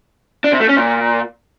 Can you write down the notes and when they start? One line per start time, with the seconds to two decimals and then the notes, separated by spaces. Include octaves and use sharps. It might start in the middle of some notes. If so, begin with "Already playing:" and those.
0.44 D4
0.52 C3
0.61 A3
0.69 C#4
0.77 A#2